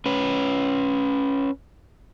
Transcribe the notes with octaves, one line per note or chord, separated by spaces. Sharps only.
C#4 B4